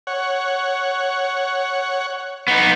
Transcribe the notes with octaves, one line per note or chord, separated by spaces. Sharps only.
C#5 F#5
B3 D#4